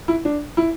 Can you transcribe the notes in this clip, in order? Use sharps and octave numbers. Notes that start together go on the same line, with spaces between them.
E4
D4
E4